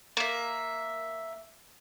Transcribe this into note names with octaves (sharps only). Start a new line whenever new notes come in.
A#3 E5